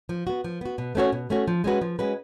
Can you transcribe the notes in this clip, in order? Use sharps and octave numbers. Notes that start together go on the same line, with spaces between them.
F3
B3 F#4
F3
B3 F#4
B2
A3 C#4 F#4 C#5
B2
A3 C#4 F#4 C#5
F3
G#3 C#4 F#4 B4
F3
G#3 C#4 F#4 B4